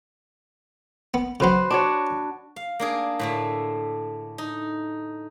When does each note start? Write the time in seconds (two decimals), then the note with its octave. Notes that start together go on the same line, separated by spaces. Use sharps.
1.14 B3
1.40 C#3 F#3 F#4 B4 C5
1.70 D4 F#4 C#5
2.56 F5
2.79 A#3 D4 G#4
3.19 A2 D3 A3
4.38 D#4